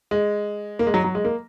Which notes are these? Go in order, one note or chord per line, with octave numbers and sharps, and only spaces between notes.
G#3
A#3
G#3
F#3
F#3
G#3
A#3